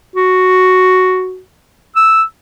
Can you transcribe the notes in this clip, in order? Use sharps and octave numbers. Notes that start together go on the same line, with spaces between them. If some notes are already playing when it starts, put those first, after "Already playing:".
F#4
E6